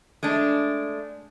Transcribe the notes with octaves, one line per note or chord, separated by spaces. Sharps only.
G#3 A3 D4